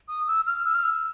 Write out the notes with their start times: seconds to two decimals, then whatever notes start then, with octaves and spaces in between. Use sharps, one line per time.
0.08 D#6
0.28 E6
0.47 F6
0.65 E6
0.74 F6
0.84 E6